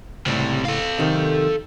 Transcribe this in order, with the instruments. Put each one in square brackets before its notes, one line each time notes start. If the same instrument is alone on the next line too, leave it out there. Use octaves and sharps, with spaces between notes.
[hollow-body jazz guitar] C#2 A2 [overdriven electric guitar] C3 G3
[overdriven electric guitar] A4 F5
[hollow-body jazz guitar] C3 D#3